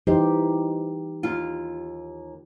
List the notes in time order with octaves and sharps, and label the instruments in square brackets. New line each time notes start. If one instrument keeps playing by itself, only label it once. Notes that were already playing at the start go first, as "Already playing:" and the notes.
[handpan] E3 D#4 G4 [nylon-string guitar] C5
[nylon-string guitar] D#2 F4